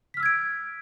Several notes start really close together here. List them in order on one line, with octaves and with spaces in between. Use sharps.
B6 F6 E6 G#6 D7